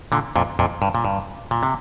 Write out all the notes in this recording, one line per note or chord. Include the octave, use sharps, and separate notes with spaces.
A#2 D3
F2 A#2
F2 A#2
G2
A#2
G2
A#2
C3